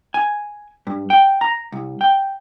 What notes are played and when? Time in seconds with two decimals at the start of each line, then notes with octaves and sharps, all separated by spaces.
0.14 G#5
0.87 G2
1.10 G5
1.41 A#5
1.72 C2
2.01 G5